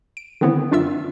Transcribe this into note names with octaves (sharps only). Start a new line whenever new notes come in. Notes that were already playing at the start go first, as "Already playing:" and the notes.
D7
D3 D#3 B3 C4 E4
F#2 D4 F4 E5 E6